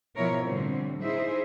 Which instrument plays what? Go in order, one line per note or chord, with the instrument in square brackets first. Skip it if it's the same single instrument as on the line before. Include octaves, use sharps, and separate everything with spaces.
[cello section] B2 F3 E4 A#4 C#5
A2 D3 G3 C4
D#4 E4 G#4 C5 E5